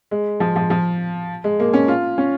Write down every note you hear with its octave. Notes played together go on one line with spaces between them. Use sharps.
G#3
F3
F3
F3
G#3
A#3
C#4
F4
C#4